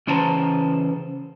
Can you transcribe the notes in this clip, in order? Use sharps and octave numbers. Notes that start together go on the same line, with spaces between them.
C#3 E3 C#4 C5 A5 A#5